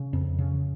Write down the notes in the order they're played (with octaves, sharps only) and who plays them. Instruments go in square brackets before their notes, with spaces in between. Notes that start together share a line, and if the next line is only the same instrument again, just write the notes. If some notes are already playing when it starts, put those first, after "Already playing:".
Already playing: [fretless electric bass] C#3
F2
C#3